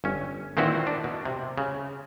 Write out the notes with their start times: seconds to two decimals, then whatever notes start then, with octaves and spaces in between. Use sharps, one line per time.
0.04 G1 C#4
0.57 A#2 D#3 E3 C4 E4 F#4
0.87 D4
1.04 B2
1.25 C3
1.58 C#3